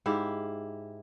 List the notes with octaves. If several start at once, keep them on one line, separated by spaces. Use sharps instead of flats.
G#2 E4 G4 F5